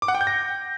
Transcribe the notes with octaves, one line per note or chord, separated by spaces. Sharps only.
D6
F#5
G5
G6
A#6